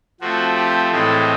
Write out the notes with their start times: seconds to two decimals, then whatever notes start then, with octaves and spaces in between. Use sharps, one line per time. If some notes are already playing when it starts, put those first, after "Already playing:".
0.21 F3 A3 C4 F#4
0.56 G4
0.91 A2 E3 G#3 C4 A4